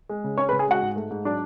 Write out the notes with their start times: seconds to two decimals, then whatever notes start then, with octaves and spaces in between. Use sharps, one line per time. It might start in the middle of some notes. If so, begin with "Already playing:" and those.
0.09 G#3
0.24 C#3
0.38 C#4 C#5 C#6
0.49 B4 B5
0.53 C#3
0.59 G#4 G#5
0.67 G#3 F#4 F#5
0.81 G#2
0.96 A3
1.11 G#2
1.25 F#3 D4 D5